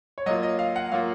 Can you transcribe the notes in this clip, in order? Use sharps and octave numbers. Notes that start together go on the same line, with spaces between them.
C#5
F#3 A#3 F4 D#5
D#5
F5
F#5
F#3 A#3 F4 F5